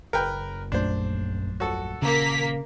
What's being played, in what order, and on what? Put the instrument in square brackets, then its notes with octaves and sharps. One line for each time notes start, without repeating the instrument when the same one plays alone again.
[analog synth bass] F#1 [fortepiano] A#4 B4 G5
[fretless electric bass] A#1 F#2 A3 [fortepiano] D4 C5
[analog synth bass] D#1 [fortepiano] F#4 A4
[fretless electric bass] C#3 [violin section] A#3 B6